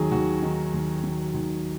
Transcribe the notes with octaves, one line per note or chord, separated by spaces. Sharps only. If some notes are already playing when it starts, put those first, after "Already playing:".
Already playing: D#2 D#3 F#3 G#4
D#2 F#4
D#3
D#2
F#3
D#2